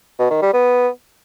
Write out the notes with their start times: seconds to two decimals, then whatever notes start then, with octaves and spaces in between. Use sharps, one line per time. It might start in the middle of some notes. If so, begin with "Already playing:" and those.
0.19 B2
0.31 D#3
0.42 G3
0.54 B3